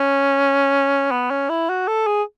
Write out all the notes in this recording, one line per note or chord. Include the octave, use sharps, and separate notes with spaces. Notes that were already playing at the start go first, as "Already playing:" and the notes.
Already playing: C#4
B3
C#4
E4
F#4
A4
G#4